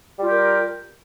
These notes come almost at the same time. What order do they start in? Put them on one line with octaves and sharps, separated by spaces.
G3 F4 G4 A#4